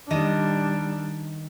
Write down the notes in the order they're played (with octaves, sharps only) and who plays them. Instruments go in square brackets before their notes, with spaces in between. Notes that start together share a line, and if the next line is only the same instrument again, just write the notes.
[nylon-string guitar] D#3 D#5 [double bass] G3 D4